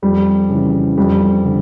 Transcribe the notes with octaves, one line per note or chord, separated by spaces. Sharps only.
F2 G3
C#3 E3
F2 G3
D3